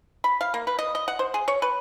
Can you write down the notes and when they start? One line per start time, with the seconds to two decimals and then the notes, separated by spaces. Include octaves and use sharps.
0.24 B5
0.41 F5
0.54 A#3
0.67 B4
0.79 D#5
0.95 D#5
1.08 F#5
1.19 C5
1.34 G#4
1.48 C#5
1.62 B4